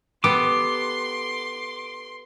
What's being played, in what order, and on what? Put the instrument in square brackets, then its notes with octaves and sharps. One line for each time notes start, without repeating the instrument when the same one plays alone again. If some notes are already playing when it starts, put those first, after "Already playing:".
[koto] B3 G4 A4 [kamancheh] C6 [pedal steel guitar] D6